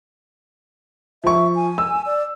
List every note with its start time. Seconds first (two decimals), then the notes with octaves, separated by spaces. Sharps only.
1.24 F3 E5 C#6
1.55 G#5
1.78 E6
2.06 D5